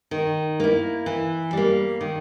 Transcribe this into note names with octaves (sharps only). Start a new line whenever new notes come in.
D#3
A#3 E4
E3
G3 A#3
D#3